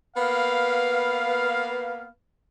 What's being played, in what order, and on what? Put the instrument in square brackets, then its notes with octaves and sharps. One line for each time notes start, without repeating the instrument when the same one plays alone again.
[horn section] A#3 B3 B4 F5